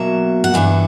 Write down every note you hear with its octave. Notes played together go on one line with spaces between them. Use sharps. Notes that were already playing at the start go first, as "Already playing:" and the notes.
Already playing: B2 F#3 A#3 E5
F#5
G2 E3 B3 D4 E5